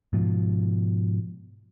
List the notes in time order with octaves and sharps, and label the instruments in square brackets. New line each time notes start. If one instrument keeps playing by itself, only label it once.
[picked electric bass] G#2 B2 F3